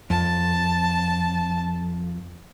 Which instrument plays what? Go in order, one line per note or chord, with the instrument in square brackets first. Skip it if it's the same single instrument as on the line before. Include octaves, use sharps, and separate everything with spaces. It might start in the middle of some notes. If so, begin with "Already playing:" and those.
[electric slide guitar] F2 [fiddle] A5